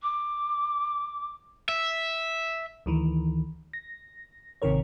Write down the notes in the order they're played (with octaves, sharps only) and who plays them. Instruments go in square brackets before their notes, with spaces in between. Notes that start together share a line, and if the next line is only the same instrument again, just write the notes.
[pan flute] D6
[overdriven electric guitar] E5
[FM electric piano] D2 D#3 E3
A#6
G#1 C3 D#3 A#4 C#5